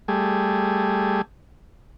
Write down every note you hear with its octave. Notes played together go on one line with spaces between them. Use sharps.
G3 A3 G#4